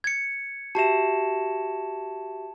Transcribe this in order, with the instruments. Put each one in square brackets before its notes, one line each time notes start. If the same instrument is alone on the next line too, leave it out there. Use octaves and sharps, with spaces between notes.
[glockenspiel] G#6 C#7
[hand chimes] F#4 G4 E5 [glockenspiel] A5 E7